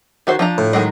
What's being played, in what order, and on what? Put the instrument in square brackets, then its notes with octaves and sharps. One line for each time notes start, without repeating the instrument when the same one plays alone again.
[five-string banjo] D#3 F#4 C5
F3 D4 A#5
[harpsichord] A2
[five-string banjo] D#3 F#3 G#3